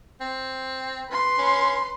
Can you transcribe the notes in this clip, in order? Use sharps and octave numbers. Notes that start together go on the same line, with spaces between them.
C4
B4 C6
C#4